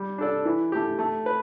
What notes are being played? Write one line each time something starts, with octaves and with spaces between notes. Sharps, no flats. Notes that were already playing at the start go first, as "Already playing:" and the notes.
Already playing: G3
D4 A4 D5
E3
A3 G4
A3
B4